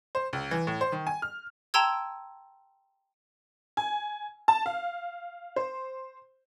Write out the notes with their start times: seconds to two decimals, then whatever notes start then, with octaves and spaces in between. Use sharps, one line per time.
0.15 C5
0.33 C#2
0.51 E3
0.67 A2
0.81 C5
0.92 D#3
1.07 G#5
1.22 F6
1.74 G5 A5 A#5 C6 E6 G#6
3.77 G#5
4.48 A5
4.66 F5
5.56 C5